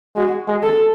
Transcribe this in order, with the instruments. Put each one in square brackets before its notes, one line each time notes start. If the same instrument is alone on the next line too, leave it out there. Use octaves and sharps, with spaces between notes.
[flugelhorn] G#3 [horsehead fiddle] F#4
[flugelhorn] G#3
[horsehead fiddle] A4